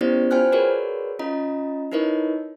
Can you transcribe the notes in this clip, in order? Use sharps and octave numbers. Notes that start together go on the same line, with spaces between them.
B3 C#4 E4 G4 C5 D5
F4 C5 G5 G#5 F6 F#6
F#4 G#4 A#4 B4 C#5 D5
C#4 F4 D#5 A#5
D#4 E4 A#4 B4 C#5 D#5